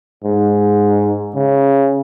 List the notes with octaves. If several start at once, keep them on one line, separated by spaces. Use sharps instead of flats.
G#2
C#3